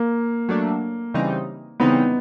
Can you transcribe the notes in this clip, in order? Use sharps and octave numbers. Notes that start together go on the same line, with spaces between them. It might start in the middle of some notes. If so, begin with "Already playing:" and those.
Already playing: A#3
F#3 A3 D4
C#3 E3 G3 C4 D#4
C#3 E3 G3 B3 C4 D#4